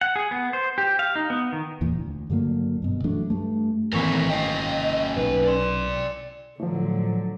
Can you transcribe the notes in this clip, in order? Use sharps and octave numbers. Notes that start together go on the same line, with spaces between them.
F#5
G#4
B3
C5
G4
F5
D#4
B3
D#3
E2 A#2 E3
D2
G2 D3 F#3 A#3
G2 B2
E3 F#3 A3 D4
G2 A3
G#1 A#2 E3 A3 C4 A#4 C#6 B6
C#4 D#5 F5 G5
B1 B4
D5 C6
A2 D3 F3 F#3